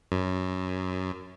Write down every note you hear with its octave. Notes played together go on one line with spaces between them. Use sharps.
F#2